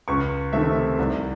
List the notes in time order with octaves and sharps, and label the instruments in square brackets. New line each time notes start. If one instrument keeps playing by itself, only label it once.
[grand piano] C#2 C#6
C3 D#3 A3 C4 E5
C2